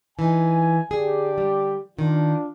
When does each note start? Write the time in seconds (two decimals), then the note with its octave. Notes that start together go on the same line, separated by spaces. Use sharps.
0.19 E3 D#4 G#5
0.91 D3 G4 G#4 D5
1.38 G3
1.99 D#3 D4 F4